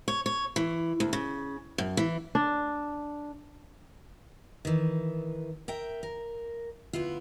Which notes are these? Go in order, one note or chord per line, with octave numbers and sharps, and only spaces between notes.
C#5
C#5
E3
D2
C#3
F#2
E3
D4
D#3 E3
A#4 E5 G5
A#4
D2 B3 E4 F4